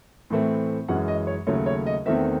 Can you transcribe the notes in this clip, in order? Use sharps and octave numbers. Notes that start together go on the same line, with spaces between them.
A2 E3 A3 C4
F#2 E3 G#3 C#4 F#5
D#5
C#5
D#2 C#3 F#3 A3 C#5
C#5
D#5
E2 D#3 A3 C4 E5